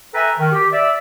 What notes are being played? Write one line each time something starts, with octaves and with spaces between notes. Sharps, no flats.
A4 B4 E5 G5 G#5 A#5
D#3
G4
D5 E5